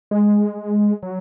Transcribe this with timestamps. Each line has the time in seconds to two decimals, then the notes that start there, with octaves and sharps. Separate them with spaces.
0.11 G#3
1.03 F#3